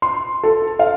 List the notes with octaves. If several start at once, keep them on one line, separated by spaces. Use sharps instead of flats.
C6
A4
F5